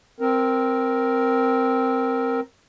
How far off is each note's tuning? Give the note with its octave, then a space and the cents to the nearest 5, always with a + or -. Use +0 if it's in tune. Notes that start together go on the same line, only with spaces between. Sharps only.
C4 +0 A#4 +0